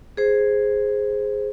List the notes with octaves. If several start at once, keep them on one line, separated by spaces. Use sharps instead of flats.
G#4 C5